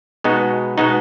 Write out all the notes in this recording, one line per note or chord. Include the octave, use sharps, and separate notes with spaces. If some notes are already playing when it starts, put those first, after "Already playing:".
B2 G#3 B3 D#4 F#4
B2 G#3 B3 D#4 F#4